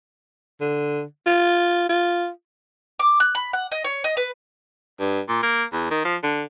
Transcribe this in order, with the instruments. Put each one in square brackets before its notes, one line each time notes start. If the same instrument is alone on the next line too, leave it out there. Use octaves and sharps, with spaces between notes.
[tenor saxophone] D3
F4
F4
[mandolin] D6
F#6
B5
F#5
D#5
C#5
D#5
B4
[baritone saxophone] G2
A#2
A#3
E2
D#3
F3
D3